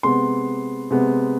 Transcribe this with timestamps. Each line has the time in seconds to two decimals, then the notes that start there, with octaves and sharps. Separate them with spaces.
0.03 C3 G#3 B3 C6
0.91 C3 G#3 B3